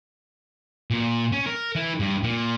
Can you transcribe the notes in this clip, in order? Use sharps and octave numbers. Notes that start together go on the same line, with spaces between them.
A#2
C#4
A#4
E3
G2
A#2